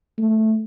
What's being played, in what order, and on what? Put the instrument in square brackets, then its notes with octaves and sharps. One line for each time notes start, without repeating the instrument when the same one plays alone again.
[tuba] A3